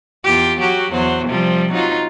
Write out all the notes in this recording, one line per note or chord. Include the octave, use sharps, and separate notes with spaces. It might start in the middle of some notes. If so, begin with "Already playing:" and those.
E2 F4 G4
F#3 F#4 G4
E2 F#3 C5
C3 F3 G3
F#3 D#4 F4